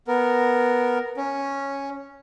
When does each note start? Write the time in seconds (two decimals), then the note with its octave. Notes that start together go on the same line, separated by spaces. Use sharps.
0.08 B3 A#4
1.17 C#4